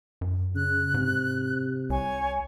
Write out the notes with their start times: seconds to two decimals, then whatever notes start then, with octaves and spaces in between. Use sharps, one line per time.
0.21 F#2
0.55 C#3 F#6
0.94 G#2 C3
1.90 C2 C#5 G#5